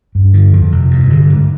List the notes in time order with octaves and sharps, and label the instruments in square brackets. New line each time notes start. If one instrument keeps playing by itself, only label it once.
[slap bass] G2
D3
F2
C3
G2
D3
G#2